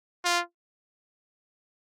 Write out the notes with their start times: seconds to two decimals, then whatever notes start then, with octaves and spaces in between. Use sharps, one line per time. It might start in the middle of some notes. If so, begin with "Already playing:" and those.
0.24 F4